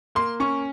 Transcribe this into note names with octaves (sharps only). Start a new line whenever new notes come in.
A#3 C6
C#4 C#6